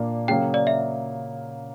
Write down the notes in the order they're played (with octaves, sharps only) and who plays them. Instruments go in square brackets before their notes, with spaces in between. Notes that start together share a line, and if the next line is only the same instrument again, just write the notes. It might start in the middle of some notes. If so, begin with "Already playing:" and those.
Already playing: [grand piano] A#2 A#3 D4
[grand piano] C#3 F#3 A#3 [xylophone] G5
[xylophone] D5
E5